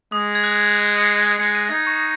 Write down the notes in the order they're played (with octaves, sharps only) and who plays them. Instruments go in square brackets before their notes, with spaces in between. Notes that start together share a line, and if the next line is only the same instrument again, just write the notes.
[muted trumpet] G#3 [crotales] D#6
[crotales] G#6
F#6
A#6
C#7
C7
[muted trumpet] G#3 [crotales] C#7
[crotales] D#7
A#6
[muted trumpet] D#4 [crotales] G#6
[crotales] C#6